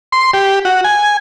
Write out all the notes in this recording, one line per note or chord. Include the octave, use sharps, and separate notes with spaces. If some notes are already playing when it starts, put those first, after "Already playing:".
C6
G4
F#4
G#5